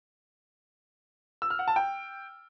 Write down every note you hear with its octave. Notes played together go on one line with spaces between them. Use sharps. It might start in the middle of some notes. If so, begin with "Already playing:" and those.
E6
F6
F#5
A5
G5